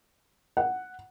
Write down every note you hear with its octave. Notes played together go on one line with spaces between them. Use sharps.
F#5